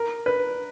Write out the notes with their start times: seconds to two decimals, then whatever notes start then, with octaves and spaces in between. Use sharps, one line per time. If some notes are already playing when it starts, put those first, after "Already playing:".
Already playing: A#4
0.26 B4